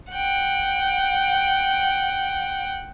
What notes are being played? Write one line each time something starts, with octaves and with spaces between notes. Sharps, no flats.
F#5 G5